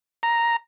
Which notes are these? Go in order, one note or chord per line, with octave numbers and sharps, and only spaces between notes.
A#5